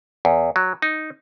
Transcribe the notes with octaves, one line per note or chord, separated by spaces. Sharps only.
E2
F#3
D#4